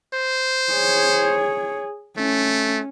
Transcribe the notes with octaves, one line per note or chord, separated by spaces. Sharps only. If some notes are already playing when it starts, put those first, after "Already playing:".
C5
G#4 C#5
A3 C#4